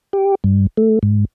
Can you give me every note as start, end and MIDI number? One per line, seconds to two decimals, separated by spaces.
0.13 0.35 67
0.44 0.67 43
0.77 0.99 57
1.03 1.25 44